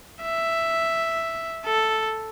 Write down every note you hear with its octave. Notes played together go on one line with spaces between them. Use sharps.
E5
A4